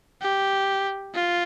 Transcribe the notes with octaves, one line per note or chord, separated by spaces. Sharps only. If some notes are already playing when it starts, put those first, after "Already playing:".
G4
F4